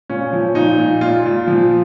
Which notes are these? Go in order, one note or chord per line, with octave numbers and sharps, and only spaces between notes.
A#2 C#4
F3
A#2 D#4
A#2
A#2 F4
A#2
F3